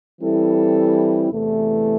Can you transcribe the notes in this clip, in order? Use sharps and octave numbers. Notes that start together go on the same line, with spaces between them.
E3 G3 C4 E4 A4
E2 C3 E3 A3